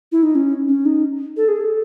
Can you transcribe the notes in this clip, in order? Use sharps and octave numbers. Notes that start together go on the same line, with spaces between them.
E4
D#4
C#4
C#4
D#4
A4
G#4
A4